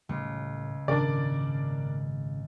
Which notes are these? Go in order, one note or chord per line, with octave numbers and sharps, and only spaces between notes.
C#2 A2 G3
G#1 A#2 C#3 D4 A#4 D5